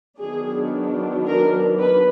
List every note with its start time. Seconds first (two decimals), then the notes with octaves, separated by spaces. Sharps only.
0.19 D#3 F#3 B3 D4 G#4
1.26 A#4
1.80 B4